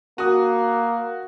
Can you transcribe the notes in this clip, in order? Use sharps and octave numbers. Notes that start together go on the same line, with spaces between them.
A#3 F#4 D#6